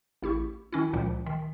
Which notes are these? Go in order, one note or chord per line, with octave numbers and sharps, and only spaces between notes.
A1 E4 G4 C#6
D#3 C#4 E4
C#2 A#2 F3
D#3